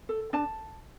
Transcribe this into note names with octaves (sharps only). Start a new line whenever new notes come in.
A4
D4 A5